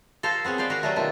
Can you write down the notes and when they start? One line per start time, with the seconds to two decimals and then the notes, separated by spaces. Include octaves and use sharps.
0.23 A4 A#4 C5 F5
0.44 B3 C4 G#4 C#5
0.58 B4 C5 D5 F5
0.70 F#4 A#4 C#5 F5
0.82 F#3 G3 A3 B4
0.96 B2 D#3 A3 F4